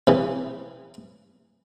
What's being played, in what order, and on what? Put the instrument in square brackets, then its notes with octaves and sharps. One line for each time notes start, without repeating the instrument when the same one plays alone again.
[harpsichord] C3 E3